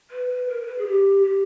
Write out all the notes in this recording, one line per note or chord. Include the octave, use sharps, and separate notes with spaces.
B4
B4
A#4
A#4
B4
G#4
G4
G4